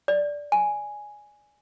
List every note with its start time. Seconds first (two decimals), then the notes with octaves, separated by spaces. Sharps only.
0.08 D5
0.52 G#5